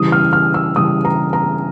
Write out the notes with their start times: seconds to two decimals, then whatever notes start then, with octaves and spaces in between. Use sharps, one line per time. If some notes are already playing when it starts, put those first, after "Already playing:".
Already playing: C#3 E3 G3 D#6
0.12 F6
0.33 F6
0.54 E6
0.76 C#3 E3 G3 D#6
1.05 A#5
1.33 A#5